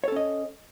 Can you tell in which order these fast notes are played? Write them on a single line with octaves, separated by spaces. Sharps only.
C#5 A4 C#4 D#5